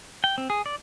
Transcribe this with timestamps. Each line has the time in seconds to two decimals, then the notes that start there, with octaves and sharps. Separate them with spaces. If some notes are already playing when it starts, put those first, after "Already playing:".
0.24 G5
0.38 C4
0.50 G#4
0.66 D5